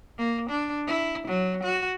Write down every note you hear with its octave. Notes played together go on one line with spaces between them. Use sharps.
A#3
D4
E4
F#3
F#4